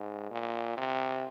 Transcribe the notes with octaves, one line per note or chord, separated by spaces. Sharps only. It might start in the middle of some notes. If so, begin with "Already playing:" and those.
Already playing: G#2
A#2
C3